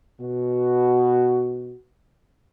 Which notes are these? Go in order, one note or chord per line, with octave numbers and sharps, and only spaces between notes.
B2 F#4